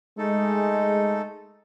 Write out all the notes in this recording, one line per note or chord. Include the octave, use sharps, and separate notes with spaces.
G#3 A3 D#4 A4